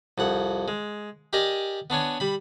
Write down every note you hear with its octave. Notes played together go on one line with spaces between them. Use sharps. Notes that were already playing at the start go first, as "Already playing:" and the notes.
C2 F2 F#5
G#3
G4 A#4 D5 D#5 G#5
B3 D4 C#5 G#5
G3 B5